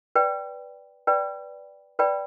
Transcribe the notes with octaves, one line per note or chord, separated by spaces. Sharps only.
B4 D5 G5 B5
B4 D5 G5 B5
B4 D5 G5 B5